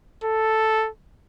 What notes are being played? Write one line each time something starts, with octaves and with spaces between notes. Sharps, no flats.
A4